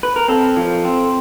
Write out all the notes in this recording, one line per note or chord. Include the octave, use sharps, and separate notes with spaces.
B4
A#4
C4 A4
F3
C4